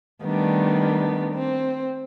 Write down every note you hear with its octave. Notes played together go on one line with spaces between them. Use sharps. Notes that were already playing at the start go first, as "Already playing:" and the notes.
D#3 G3 A3 B3 D4
C4